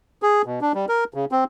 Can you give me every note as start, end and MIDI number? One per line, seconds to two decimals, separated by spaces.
0.22 0.42 68
0.46 0.60 47
0.61 0.72 62
0.75 0.86 55
0.89 1.04 70
1.14 1.25 49
1.32 1.44 60